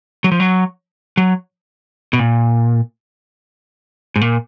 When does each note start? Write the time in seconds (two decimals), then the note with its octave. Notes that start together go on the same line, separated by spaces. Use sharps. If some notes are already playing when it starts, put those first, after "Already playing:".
0.24 F#3
0.32 F3
0.40 F#3
1.17 F#3
2.13 B2
2.19 A#2
4.16 G#2
4.21 A#2